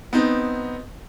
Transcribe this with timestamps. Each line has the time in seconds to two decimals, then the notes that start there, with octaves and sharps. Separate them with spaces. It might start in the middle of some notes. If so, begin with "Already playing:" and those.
0.13 B3 C4 D#4